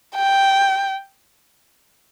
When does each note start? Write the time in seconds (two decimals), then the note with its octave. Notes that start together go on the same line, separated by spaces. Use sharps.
0.15 G5